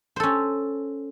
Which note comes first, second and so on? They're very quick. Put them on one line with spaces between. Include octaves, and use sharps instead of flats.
C5 A4 C#4